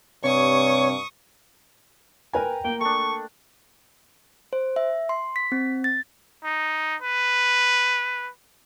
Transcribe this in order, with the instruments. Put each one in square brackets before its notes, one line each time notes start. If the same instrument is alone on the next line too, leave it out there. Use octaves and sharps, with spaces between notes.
[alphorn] G2 [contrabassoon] C3 [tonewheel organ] C#5 [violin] C#6 D#6
[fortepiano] A#4 B4 G#5 [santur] G5 A#5
[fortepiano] A#3 [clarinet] G5
[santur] A3 D4 [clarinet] C#6
[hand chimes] C5
E5
C6
B6
C4
A6
[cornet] D#4
B4